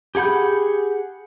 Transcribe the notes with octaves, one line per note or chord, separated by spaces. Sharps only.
G4 G#4 F#5 B5 G6